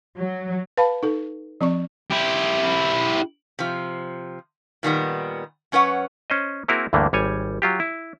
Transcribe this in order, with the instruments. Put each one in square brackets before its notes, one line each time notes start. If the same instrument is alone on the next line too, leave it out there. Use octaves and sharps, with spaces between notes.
[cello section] F#3
[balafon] B4 F5 A5 B5
D#4 A4
F3 C4 D5 C#6
[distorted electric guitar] E4 G4
[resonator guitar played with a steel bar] C3 F3
A#2 D#3 G3 B3
F#2 C#4 B4 C#5 F#5
[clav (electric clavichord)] C#4 C5 D#5
A#3 C4 E4 F#4 G#4 A#4
D2 G2 D3 E3 A3 A#3
G#1 G3 C#5 G#5
F#3 F4 G4
E4